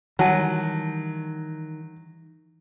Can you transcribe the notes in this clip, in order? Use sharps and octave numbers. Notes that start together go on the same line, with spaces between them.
D#3 E3 F#3 G3 F#5 A5